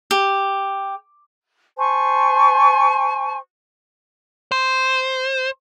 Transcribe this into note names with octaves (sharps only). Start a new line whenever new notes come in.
G4
C5 G#5 A5 C#6
C5